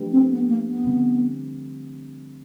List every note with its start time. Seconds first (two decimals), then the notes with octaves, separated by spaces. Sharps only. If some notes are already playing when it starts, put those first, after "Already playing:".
Already playing: F3 A3 D4 G4 B4
0.12 C4
0.31 B3
0.48 A#3
0.67 B3
0.84 D3 G3 C4